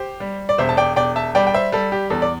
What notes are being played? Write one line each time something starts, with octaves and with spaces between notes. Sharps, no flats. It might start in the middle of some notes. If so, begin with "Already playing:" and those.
Already playing: G4 C5
G3
D5
E1 C5 E5
A5
D5 G5
E1 D5 G5
E5 A5
G3 D5 G5
G5
C5 E5
G3 A4
G4
E2 A4
D5